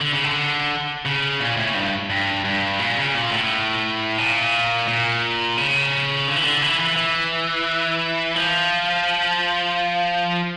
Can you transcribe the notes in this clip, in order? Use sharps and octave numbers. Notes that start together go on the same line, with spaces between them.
D3
C#3
D3
C#3
A#2
A2
G2
G2
G2
A#2
C#3
A#2
A2
A#2
A#2
C#3
D3
E3
D3
E3
E3
E3
F3